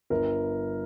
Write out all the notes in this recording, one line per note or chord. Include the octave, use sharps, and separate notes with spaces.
G1 A#4